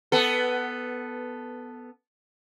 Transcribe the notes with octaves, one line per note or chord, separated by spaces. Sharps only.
B3 A4